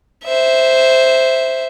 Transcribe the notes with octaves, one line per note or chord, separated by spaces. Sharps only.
C5 E5